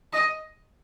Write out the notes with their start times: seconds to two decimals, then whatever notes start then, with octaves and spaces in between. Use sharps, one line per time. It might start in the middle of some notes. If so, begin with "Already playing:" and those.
0.13 D#5